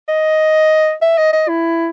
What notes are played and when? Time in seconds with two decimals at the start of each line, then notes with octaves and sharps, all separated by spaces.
0.09 D#5
1.02 E5
1.18 D#5
1.33 D#5
1.48 E4